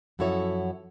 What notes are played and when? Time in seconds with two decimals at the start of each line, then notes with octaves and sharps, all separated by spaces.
0.19 F#2 F3 E4 F#4 A4 C#5